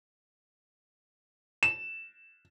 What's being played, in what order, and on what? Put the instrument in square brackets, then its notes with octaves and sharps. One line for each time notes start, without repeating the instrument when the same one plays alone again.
[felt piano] E7